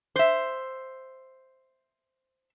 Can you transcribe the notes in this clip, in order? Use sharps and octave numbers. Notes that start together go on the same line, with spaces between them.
C5 E5